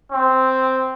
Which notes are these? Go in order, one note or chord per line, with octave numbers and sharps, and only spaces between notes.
C4